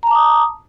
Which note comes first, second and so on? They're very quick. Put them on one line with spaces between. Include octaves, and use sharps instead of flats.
A#5 A5 D6 D#6